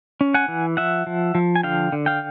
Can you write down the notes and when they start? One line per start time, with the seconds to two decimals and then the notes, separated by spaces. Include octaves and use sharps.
0.21 C#4
0.34 F#5 G#5
0.48 E3
0.77 F3 E5 F#5
1.07 F3
1.35 F3
1.56 G#5
1.63 D3 F5 G5
1.92 D3
2.06 F5 G5